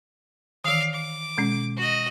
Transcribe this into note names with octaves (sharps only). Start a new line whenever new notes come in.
D#3 E3 F5 D6
D6
B2 G#3 C#4
F#4 D#5